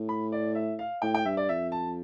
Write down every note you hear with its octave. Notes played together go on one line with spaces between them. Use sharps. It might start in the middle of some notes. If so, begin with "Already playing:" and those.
Already playing: A2
B5
D5
E5
F5
A2 G5
G5
G2 E5
D5
F2 E5
A5